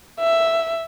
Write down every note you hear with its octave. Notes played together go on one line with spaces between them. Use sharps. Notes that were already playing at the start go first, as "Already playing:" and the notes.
E5